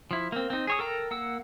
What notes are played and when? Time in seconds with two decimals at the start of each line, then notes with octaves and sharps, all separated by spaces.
0.11 F3 E4
0.32 A#3 C4
0.50 C4 D#4
0.67 G#4 C#5 D#6
0.79 A4 A#4 G5 A#5
1.11 A#3 F#5 E6